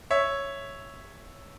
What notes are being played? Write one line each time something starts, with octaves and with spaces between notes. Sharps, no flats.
C#5 E5